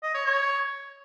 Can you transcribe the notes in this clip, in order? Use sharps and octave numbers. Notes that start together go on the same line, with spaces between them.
D#5
C#5
C#5